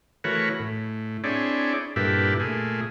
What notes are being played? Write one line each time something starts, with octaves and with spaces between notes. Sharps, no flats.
E3 A3 F#4 A#4 B4 C#5
A2
C4 D4 E4 G#4 C#5 D5
G2 A#2 E4 G4 A4 B4
A#2 A3 G#4